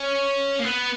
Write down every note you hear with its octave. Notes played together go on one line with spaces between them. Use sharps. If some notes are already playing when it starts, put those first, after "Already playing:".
Already playing: C#4
A#3
B3